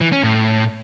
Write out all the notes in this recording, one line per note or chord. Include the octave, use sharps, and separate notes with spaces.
E3
C#4
A2